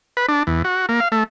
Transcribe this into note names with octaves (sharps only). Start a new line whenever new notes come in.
B4
D4
E2
F#4
A#3
F5
A3